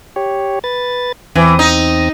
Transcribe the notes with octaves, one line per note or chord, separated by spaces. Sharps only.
G4 C#5
B4 A6
E2 E3 C4 D#6
D#4